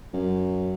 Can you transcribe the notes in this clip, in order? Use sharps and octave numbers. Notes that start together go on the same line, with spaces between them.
F#2